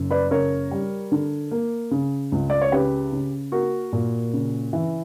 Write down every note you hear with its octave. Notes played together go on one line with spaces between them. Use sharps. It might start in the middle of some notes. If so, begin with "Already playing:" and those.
Already playing: F#1 F#2
B4 D5
C#3 A#4 C#5
G3
D3
A#3
C#3
C#2
D5
C#5
C#3 G4 B4
C#3
A#3 F#4 A#4
A#2
C#3
E3